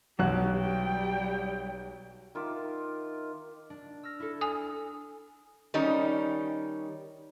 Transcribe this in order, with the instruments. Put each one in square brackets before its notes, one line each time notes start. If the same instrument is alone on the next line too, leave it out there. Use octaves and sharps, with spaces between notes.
[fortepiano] B1 F#4 F#6 [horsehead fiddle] G4
[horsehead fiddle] G3 G5
[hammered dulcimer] D#3 F4 E5 D6
[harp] D4
E6 F6 A#6
E4 A4
[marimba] G#5 D#6
[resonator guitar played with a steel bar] D#3 G3 C#4 D#4